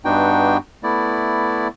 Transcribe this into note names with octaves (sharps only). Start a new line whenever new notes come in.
G2 B3 D4 D#4 F#4 G5
A3 B3 E4 D5